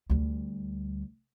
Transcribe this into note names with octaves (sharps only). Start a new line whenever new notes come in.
D2 G3